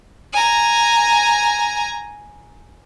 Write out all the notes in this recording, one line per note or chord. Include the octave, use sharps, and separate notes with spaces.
G#5 A#5